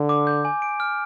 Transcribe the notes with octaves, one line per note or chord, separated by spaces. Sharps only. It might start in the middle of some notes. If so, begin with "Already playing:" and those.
Already playing: D3
D6
G6
G#5
D7
F6